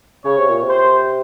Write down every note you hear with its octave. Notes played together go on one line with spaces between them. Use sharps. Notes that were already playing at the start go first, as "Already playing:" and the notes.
C#3 C#5
C3
A#2
C3
C5